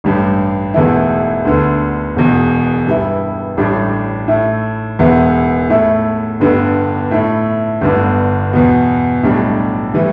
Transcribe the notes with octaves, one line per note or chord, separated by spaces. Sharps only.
A1 G2 G3
E1 E2 E3 A3 E4
D2 D3 B3
E1 E2 B2
G2 G3 B3 E4
A1 A2 G3 D4
A2 A3 E4
E1 E2 E3 B3 E4
A2 A3 E4
G1 G2 D3 G3 B3
A2 A3 E4
G1 G2 D3 B3
E2 B2 B3
B1 A2 G3 D4
A2 E3 G3